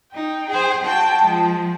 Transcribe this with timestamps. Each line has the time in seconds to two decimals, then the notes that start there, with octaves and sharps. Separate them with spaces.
0.14 D#4 G5
0.50 G#4 C5
0.84 F#4 G5 A5
1.24 F3 G#3